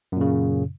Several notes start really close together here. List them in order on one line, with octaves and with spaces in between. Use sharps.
F#2 A#2 C#3